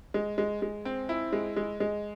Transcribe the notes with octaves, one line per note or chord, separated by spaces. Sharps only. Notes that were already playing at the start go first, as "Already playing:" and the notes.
G#3
G#3
G#3
C4
E4
G#3
G#3
G#3